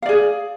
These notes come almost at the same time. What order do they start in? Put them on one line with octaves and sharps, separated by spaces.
F5 D5 G#4